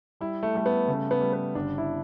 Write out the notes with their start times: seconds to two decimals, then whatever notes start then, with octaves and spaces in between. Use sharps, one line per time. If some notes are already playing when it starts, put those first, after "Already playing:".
0.21 G3 E4
0.43 A3
0.55 G3 A3
0.66 B3
0.88 C#3 A3
1.11 B3
1.21 G3
1.33 B3
1.55 G1 D4
1.78 E4